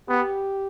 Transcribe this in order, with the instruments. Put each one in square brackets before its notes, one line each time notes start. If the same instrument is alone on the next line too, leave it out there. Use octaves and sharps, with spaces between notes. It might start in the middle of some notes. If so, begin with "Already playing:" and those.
[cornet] B3 [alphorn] G4